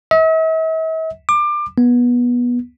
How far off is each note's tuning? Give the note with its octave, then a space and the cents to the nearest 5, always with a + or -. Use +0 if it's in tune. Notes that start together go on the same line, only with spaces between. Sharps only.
E5 -45
D6 +25
B3 -20